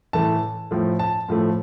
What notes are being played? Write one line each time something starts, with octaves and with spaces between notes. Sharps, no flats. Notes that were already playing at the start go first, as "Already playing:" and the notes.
A2 E3 A3 A5
A2 F3 A3
A5
A2 F3 A3